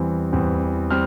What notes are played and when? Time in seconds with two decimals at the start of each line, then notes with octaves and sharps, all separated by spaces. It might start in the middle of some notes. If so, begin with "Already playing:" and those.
Already playing: E2 E3 G3 C4
0.32 E2 E3 G3 C4
0.90 G3 C4 F6